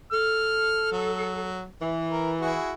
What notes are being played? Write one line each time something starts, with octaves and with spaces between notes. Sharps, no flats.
A4 F6
F#3
E3
A#4
E4 F#4 G#4